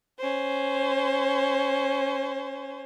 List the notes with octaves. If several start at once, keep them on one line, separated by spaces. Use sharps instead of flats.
C#4 C5